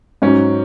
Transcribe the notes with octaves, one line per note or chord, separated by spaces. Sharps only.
G#2 F#3 C#4